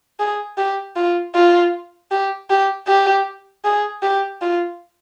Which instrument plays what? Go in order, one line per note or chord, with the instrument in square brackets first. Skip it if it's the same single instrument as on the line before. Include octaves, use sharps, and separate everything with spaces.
[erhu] G#4
G4
F4
F4
G4
G4
G4
G#4
G4
F4